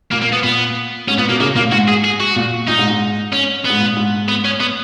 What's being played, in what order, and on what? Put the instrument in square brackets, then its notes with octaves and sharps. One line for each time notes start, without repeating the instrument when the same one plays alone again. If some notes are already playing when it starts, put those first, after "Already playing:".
[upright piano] A#2 [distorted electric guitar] A#3
[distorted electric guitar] A#3
B3
[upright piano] A#2 [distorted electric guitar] B3
[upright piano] G#2 [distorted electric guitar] C#4
[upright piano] A#2 [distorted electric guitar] B3
[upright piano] B2 [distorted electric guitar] A#3
[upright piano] C#3 [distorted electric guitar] A#3
[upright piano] A#2 [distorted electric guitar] A#3
[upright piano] G#2 [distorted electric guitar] F#4
[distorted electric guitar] G#4
G#4
F#4
[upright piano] A#2
[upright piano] A#2 [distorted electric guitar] D#4
[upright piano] G#2
G#2
[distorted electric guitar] C#4
B3
[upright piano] G#2
A#2
G#2
[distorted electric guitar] B3
C#4
B3